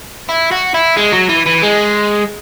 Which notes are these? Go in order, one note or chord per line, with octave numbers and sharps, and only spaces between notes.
E4
F#4
E4
G#3
F#3
E3
E3
G#3